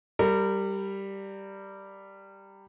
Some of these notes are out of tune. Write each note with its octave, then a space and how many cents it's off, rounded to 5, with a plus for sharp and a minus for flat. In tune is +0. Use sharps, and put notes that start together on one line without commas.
G3 +0 A#4 -30